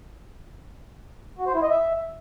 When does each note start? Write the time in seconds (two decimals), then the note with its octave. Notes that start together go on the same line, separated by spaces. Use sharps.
1.38 F#4
1.46 C5
1.54 E4
1.62 D#5
1.70 E5